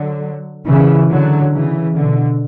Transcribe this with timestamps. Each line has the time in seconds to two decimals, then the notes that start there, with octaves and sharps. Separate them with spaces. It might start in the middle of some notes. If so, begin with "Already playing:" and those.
Already playing: D3 F#3
0.67 C#3 E3
1.10 D3 F#3
1.53 C#3 E3
1.96 B2 D3